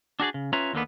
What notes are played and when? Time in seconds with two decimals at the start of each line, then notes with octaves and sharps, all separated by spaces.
0.20 D4 F#4 G#4 D5
0.34 C#3
0.53 C#4 F4 B4 C#5 E5 A#5
0.73 D#2 D3 A#3 B3